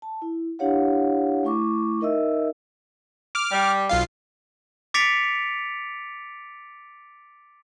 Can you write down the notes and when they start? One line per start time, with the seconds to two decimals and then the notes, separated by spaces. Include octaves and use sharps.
0.02 A5
0.22 E4
0.59 D4 E4 G4 C#5 F5 F#5
1.44 A3 E4 C#6 D6
2.01 D#4 A#4 D#5 E5 E6
3.35 D6 F6
3.52 G3
3.89 B1 F4 F5
4.94 D6 A6 B6 C#7 D7 F7